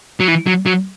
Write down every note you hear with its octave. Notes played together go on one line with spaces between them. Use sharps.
F#3
E3
F#3
F#3